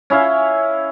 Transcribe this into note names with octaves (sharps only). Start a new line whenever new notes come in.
C#4 E4 E5 F5